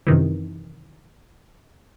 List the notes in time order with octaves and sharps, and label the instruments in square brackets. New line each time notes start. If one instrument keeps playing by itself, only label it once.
[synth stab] F#2 C3 D#3 E3